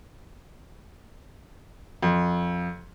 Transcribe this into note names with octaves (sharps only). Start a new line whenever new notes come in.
F2